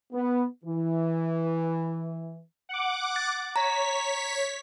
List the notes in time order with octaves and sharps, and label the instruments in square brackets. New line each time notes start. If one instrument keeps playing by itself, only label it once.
[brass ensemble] B3
E3
[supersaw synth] F#5 D6
[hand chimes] A6
[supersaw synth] C#5 B6 [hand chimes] A#5